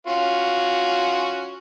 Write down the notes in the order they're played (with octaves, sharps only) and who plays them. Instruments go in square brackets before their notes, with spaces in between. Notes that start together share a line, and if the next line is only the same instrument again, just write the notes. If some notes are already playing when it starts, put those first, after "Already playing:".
[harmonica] C#4 F4 F#4